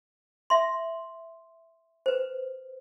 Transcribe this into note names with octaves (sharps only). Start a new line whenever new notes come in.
E5 C6
B4 C5